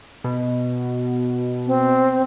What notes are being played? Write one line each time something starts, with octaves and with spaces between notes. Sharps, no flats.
B2
C4